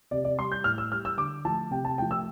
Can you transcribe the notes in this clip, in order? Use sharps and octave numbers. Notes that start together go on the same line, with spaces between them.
C3 D5
D5
G3 C6
G6
A2 F6
E6
G3 F6
E6
D3 D6
F3 A3 A5
C3 G5
A5
F3 A3 G5
E6